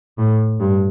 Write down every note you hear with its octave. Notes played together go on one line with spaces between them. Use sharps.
A2
G2